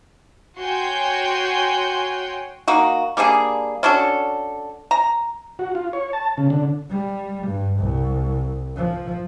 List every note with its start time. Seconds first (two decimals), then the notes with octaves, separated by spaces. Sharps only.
0.59 F#4 C#5 G5 G#5 C6 G6
2.68 A#3 D#4 F#4
3.17 G3 A#3 D4 G#4
3.83 C#4 D4 F#4 A4
4.91 A#5
5.59 F#4
5.75 F4
5.93 C#5
6.13 A5
6.38 C#3
6.50 D3
6.90 G3
7.47 G2
7.79 C2
8.76 F3